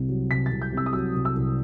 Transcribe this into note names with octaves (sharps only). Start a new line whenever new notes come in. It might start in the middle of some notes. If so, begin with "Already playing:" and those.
Already playing: C2 C3
F#3
C2 B6
C2 A6
G6
C3 E6
D#6
F#3 E6
C2
E6
C2